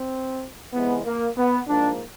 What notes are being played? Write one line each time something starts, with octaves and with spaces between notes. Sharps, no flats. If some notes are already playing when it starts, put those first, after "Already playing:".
Already playing: C4
C3 E3 G#3 B3
A#3
B3
G#2 F3 A#3 D4